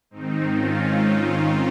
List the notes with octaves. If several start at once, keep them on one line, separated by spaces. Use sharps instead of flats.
G#2 D#3 C4 D#4
C#4 F4